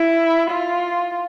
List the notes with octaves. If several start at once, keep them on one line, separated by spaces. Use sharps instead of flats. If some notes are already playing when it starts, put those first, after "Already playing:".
Already playing: E4
F4